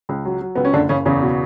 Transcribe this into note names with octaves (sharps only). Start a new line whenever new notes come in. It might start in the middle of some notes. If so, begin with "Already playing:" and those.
C#2
F#3
F#3
C#2 B3
C#4
F#1 D3 D4
F#1 C#3 C#4
E2 C#3 C#4
B2